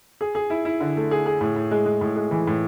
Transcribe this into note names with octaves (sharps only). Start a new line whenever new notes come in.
G#4
G#4
E4
E4
D3
A3
G#4
G#4
A2
A2
G#3
G#3
A2
G#3
E3
A2